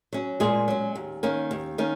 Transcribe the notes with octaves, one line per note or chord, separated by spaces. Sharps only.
F#3 C#4
A#2 G#3 G#4
F#3 C#4
D#2
D#3 A#3 C#4
D#2
D#3 A#3 C#4